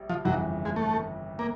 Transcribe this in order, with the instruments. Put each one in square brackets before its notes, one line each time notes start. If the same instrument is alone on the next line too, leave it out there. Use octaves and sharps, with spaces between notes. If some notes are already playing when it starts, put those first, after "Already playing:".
Already playing: [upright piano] A#1 G3
[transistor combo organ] F3
[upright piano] G1 F2 C#3 E3 [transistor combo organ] F#3
[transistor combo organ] G#3
A3
A#3